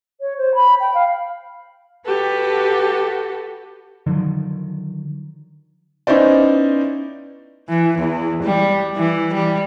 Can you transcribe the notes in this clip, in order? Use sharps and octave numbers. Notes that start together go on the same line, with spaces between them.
C#5
C5
B5
G5
F5
F#4 G4 A4 B4
D3 D#3 F3 F#3
B3 C#4 D#4 E4 C5 D5
E3
E2
G3
E3
G3